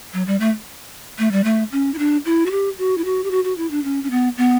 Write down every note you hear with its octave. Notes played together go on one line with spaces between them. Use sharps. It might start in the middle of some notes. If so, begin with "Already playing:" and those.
F#3
G3
A3
A3
G3
A3
C#4
E4
D4
E4
F#4
G4
F#4
E4
F#4
G4
F#4
F#4
E4
D4
C#4
C#4
B3
B3